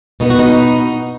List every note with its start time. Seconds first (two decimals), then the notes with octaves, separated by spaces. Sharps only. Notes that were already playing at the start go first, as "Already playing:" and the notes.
0.20 B2 B3 D#4
0.30 F#4
0.39 D#4